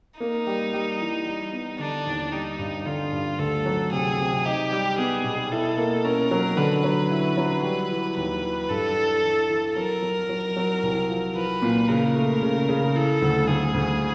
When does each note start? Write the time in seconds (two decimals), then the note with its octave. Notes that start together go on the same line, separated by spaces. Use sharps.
0.20 A#3 D#4
0.47 G3
0.73 G3
1.00 E3
1.27 G3
1.52 B3
1.79 D3 D4
2.07 D#2
2.32 G3 D#4
2.59 G2
2.86 D3 F4
3.12 G2
3.39 D2 A4
3.66 F#3
3.92 C3 G#4
4.18 C3
4.45 D#4 G4
4.72 G3
4.98 B3 G#4
5.24 B2
5.51 E4 A4
5.77 A#3
6.04 C#4 A#4
6.31 F#3
6.57 D3 B4
6.84 F#3
7.11 E4
7.37 F#3
7.63 G3 B4
7.91 E3
8.17 D#2 B4
8.44 E3
8.69 G2 A4
8.96 E3
9.23 E3
9.50 E3
9.76 F#3 A#4
10.02 F#3
10.29 F#3
10.56 F#3
10.83 C2
11.09 F3
11.35 F3 B4
11.62 A#2
11.88 C#3 A#4
12.16 A3
12.42 C#3
12.69 C#3
12.95 E3 A4
13.22 D2
13.48 D2 G#4
13.74 D2